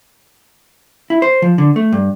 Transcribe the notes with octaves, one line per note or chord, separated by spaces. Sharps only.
E4
C5
F3
D3
A3
G2